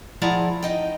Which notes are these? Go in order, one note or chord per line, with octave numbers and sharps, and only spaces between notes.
F3 E4 G#4 D5 F#5 A#5
D#4 D#5 G5